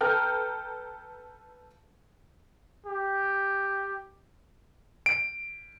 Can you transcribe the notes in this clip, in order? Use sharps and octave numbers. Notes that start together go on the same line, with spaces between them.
A4 B4 G5 A#5 F6 G6
G4
D7